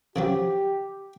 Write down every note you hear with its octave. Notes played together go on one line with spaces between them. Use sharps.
C#3 F3 F#3 G4